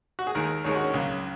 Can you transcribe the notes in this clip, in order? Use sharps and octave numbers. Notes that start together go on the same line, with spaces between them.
F#4
G#4
D#2 D#3 G#3 A#4
D#2 D#3 G#3 C#5
F#4
C#4
C#2 C#3 F#3